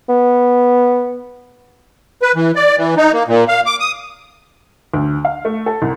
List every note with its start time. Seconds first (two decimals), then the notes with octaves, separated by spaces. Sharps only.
0.09 B3
2.22 B4
2.36 E3
2.56 D5
2.78 E3
2.97 D#4
3.13 A#3
3.28 A#2
3.48 F5
3.66 D6
3.80 D#6
4.94 D2
5.25 F5
5.45 A3
5.66 A4
5.82 C2